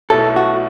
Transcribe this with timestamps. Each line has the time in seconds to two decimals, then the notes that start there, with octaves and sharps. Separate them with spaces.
0.10 B1 B2 A3 E4 A4
0.36 F#4